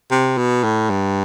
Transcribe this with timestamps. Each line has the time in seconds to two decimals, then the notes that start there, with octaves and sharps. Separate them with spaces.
0.11 C3
0.37 B2
0.64 A2
0.90 G2